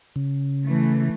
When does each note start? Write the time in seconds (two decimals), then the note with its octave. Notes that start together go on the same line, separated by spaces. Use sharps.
0.16 C#3
0.64 E3 A3